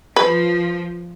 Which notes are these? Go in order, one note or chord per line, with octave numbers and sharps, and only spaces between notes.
F3 B4